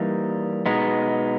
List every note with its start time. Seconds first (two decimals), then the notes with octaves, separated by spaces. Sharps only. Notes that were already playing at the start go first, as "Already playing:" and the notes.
Already playing: E3 G3 A#3 D#4
0.66 B2 G#3 B3 D#4